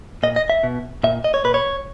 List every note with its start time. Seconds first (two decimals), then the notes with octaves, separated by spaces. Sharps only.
0.23 A#2 D#5
0.36 D#5
0.50 E5
0.63 B2
1.03 A#2 E5
1.24 D#5
1.34 C#5
1.44 A#2 B4
1.54 C#5